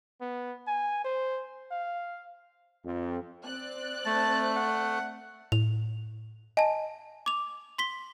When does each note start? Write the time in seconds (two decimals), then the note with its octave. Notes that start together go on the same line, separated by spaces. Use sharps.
0.21 B3
0.67 G#5
1.04 C5
1.71 F5
2.84 F2
3.45 C4 D5 F#6
4.06 A3 A5
4.56 F#5
5.52 A2 F7
6.57 D#5 G#5 A5
7.26 D6 F7
7.78 C6 B6 G7